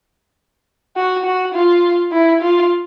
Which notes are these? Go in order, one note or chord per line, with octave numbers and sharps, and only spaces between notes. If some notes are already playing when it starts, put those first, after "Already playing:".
F#4
F#4
F4
E4
F4